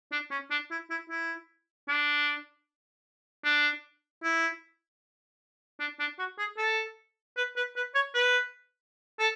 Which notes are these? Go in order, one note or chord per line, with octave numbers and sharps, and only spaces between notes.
D4
C#4
D4
E4
E4
E4
D4
D4
E4
D4
D4
F#4
G#4
A4
B4
B4
B4
C#5
B4
A4